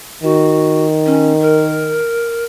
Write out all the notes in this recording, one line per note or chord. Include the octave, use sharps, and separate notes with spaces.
D#3 F#4
C#4
A#4